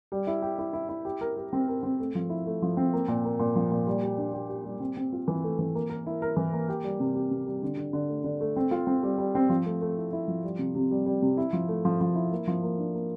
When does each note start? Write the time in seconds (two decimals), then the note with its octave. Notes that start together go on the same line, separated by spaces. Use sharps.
0.12 G3
0.27 E4
0.42 G4
0.59 E4
0.73 E4
0.89 E4
1.05 G4
1.21 A#4
1.37 G4
1.53 C4
1.68 A#4
1.83 C4
1.99 A3
2.15 F3
2.30 E4
2.47 A3
2.62 F3
2.77 C4
2.93 A#3
3.08 A#2
3.25 A#3
3.39 A#2
3.56 F3
3.71 A#2
3.87 G3
4.02 G4
4.18 D4
4.33 G4
4.49 G4
4.65 G3
4.80 C4
4.97 C4
5.13 F4
5.28 E3
5.44 A3
5.59 E3
5.75 A#3
5.90 A#4
6.06 E4
6.22 A#4
6.37 E3
6.53 A#3
6.68 G4
6.83 G3
7.00 C3
7.15 G4
7.31 C3
7.46 G3
7.63 D3
7.77 D3
7.93 D3
8.09 A3
8.24 D3
8.41 A3
8.56 C4
8.71 F4
8.87 C4
9.03 G3
9.18 G3
9.35 C4
9.49 F3
9.66 A3
9.81 A3
9.98 E4
10.13 E4
10.28 F3
10.43 G3
10.59 C3
10.75 C3
10.91 G3
11.06 G3
11.22 C3
11.37 E4
11.53 F3
11.69 A3
11.85 F3
12.01 F3
12.15 E4
12.32 A#3
12.47 F3
12.63 A#3
12.79 D4
12.94 A#3